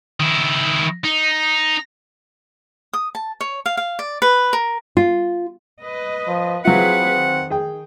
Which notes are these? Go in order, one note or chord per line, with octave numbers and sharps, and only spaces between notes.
D#3 E4
D#4
D#6
A5
C#5
F5
F5
D5
B4
A#4
F4
B4 D#5
F3
F#3 C4 E4 F4 G#4 B4 F#5
D#3
G#4 G5